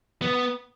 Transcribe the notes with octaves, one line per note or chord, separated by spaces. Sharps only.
B3